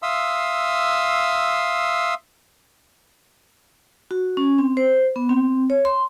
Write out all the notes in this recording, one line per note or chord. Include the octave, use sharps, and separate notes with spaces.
E5 F5 C6 D#6 E6
F#4
C#4
C4
C5
B3
C4
C#5
C6